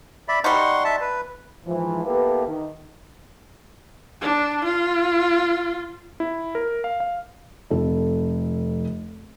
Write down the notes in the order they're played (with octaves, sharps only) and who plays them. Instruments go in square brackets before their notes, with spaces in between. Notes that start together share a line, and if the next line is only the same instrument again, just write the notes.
[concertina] D5 E5 B5
[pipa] G3 D#4 [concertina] F#5 C6 C#6
[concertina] E5 A5
B4
[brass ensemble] G#2 E3 F3
A#3 B3 E4 G4 A4 B4
D#3
[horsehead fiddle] D4
F4
[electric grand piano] E4
A#4
F5
F5
[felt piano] F1 A4